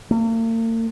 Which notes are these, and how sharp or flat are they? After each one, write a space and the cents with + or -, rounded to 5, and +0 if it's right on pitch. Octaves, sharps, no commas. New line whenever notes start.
A#3 -45